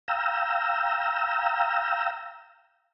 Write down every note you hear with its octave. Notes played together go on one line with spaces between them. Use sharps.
F5 G5 A#5 E6